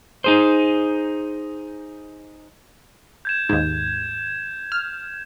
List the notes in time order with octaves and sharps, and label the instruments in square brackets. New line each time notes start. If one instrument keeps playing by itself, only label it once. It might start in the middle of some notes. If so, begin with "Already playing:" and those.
[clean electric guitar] D#4 G#4 C5
[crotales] G6 G#6 E7
[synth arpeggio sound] D#2 G#2 [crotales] G#6
[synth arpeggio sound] F6